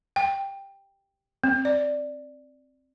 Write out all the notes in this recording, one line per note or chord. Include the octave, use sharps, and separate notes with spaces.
G5
C4
D5